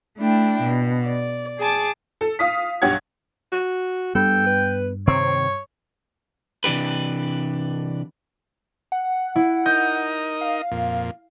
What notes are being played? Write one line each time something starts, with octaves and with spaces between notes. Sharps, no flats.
A3 D4 E4 G5
B2
D5
G#4 G#5 A5 D6
A4
F5 D#6 B6
B1 G2 G4 C#5 F#5 G#6
F#4
G2 B3 A4 G5
B4
C3 D#3 C4 C#5
C3 E3 D4 G4 B4
F#5
E4
D#4 A#4 D#5 G6
F5
F2 A#2